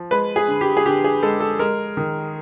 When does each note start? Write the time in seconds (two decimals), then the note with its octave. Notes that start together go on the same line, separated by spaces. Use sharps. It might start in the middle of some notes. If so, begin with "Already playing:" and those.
Already playing: F3
0.11 G#3 B4
0.36 G#4
0.48 D3
0.61 G4
0.77 G#4
0.86 D3 G4
1.04 G#4
1.23 G#3 A4
1.40 A4
1.59 G#3 A#4
1.97 D#3